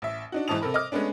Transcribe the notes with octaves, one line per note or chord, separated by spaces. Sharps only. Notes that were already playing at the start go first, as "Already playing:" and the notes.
A1 E5
D4 D#4 F#4
G#2 E3 D#4 A5 D#6 F7
C3 A4 A#4 B5
D#5 D6 F6
G#3 A3 B3 C#4 D4